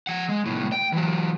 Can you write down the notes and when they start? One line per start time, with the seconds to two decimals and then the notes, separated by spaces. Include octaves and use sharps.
0.07 F3 F#5
0.29 G#3
0.46 C2 A2
0.72 G5
0.92 E3 F#3